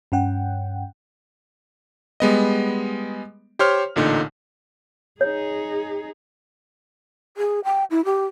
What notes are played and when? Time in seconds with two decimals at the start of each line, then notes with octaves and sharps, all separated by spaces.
0.12 G2 C#4 F#5 G5
2.20 G3 G#3 B3 D#5
3.59 G4 C5 C#5 C6 F6
3.96 A1 A#2 D3 D#4
5.21 D#4 G#4 C#5
7.37 G#4
7.65 G5
7.91 E4
8.05 G4